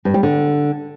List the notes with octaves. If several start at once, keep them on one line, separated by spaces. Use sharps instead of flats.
G2
G3
D3